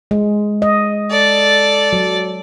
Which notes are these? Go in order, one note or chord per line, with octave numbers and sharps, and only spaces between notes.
G#3
D#5
A4 D5
F#3